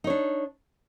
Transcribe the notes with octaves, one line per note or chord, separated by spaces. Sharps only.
D4 D#4 C#5